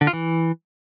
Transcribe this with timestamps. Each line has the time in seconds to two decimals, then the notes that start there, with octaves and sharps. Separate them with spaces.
0.01 D3
0.07 F4
0.13 E3